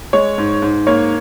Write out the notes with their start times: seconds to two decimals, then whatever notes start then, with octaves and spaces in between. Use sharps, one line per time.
0.13 G#3 C#5
0.38 G#2
0.62 G#2
0.87 A#3 C#5